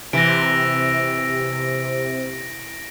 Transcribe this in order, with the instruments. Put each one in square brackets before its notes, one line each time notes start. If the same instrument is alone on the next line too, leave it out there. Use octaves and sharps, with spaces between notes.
[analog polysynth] C3 [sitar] E3 [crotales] A#6 D7